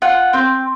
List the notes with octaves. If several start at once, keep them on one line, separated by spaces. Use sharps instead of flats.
F4 F#5
C4 G5